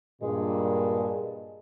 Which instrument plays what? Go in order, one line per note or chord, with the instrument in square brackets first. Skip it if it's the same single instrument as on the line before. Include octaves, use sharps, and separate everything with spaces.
[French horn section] G2 A#2 [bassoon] G#3